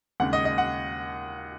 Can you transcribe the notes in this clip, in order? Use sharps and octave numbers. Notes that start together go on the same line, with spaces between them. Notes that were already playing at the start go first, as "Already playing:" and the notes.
D#2 C#3 G#3 F#5
D#5
D#5
F#5